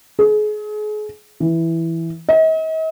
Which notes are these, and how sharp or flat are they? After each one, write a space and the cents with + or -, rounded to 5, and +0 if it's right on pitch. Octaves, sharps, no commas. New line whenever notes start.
G#4 +35
E3 +0
D#5 +45